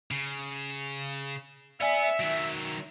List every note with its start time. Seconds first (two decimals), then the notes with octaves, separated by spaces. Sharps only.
0.11 C#3
1.81 B3 D5 E5 G#5
2.20 D#3 F#3 D7